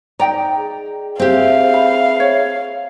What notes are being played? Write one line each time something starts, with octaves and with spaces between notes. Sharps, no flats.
D#4 D5 G5 A#5
G#4
C4 G4 G#4 C5 E5 F5
B5
C#5